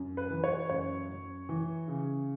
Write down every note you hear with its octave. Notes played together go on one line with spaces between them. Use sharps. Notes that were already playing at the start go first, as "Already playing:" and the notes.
Already playing: F#2
B4
E3
C#5
F#2 C#5
F#2
E3
C#3